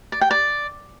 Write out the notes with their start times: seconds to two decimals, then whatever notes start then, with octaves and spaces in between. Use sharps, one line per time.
0.12 D5
0.21 G5
0.31 D5